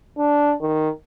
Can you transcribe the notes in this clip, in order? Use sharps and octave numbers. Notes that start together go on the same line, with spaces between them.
D4
D#3